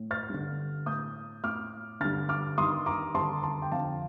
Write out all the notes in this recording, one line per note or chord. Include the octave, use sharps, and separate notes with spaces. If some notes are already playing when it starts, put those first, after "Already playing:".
Already playing: A2
F6 A6
G2 D3
A2 D#6 G6
A2 D6 F6
G2 D3 F6 A6
D6 F6
G2 D#3 C6 D#6
A#5 D6
G2 D3 A5 C6
A5 C6
G5
F2 D3 F5 A5